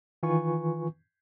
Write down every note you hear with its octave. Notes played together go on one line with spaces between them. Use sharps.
D#3 E3 F4 B4 G#5 C#6